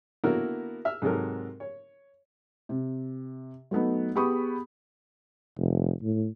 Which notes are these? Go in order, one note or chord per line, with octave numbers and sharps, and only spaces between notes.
D3 A#3 B3 E4 F#4 A#4
E5 F6
G#2 C3 F#3 A4 A#4
C#5
C3
F#3 A3 B3 D#4
B3 G4 G#4 B5 C#6 D#6
F1
A2